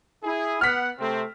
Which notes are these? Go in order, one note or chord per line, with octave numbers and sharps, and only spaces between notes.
E4 G#4
B3 F#5 F6 B6
C3 A3 C4